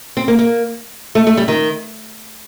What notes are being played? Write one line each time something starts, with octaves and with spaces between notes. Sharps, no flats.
C4
A#3
A#3
A3
A3
G3
D#3